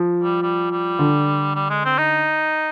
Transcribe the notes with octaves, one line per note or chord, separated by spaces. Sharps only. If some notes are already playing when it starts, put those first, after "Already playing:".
Already playing: F3
G3
G3
G3
D3
G3
G#3
C4
D#4